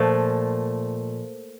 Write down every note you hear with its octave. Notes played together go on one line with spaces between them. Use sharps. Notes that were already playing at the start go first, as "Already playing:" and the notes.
Already playing: A#2 F3 A3